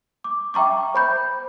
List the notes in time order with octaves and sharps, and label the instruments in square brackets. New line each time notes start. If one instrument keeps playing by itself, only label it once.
[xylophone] D6
E5 G5 A#5 C#6 D6
C5 B5 G6